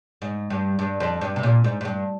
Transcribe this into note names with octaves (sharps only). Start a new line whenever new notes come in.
G#2
G2
G2
F2
G2
C3
A#2
G#2
G#2
G2